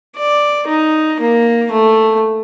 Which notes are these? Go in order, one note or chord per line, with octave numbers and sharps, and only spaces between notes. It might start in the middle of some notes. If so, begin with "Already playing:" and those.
D5
D#4
A#3
A3